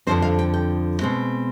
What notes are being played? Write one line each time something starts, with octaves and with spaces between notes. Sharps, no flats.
F2 D3 F3 C4 C5
F5
G5
G5
B2 G#3 C4